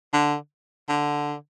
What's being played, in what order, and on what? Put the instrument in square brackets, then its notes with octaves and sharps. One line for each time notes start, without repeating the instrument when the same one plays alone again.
[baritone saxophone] D3
D3